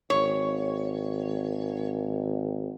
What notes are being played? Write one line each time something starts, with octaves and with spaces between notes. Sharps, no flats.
G#1 C#5